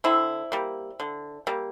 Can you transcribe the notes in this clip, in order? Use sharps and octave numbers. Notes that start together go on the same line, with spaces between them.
D3 C4 E4
G3 A#3
D3
G3 A#3